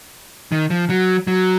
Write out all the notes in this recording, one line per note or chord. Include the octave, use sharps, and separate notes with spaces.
D#3
F3
F#3
F#3